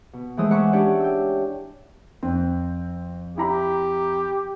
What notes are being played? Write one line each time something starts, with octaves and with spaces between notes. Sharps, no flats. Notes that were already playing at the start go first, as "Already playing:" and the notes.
B2
E3 G#3 A3 C5 D#6 E6
E5 F#5 G#5 B5 C#6 D6
C#4 D4 E4 G4 C#5 D5
G5 E6
F2 C4
E4 G4 A#5 B5